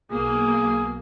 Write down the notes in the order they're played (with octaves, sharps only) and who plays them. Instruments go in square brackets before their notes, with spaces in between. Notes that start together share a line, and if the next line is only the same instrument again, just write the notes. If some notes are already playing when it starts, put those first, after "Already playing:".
[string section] B1 A#3 [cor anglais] G#4